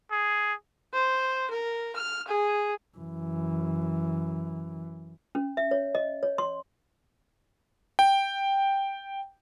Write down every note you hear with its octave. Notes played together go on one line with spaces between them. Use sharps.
G#4
C5
A#4
F6
G#4
F#2 E3
C#4
E5
C#5
D#5
C#5
C6
G5